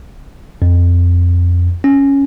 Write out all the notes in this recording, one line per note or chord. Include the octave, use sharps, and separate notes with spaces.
F2
C#4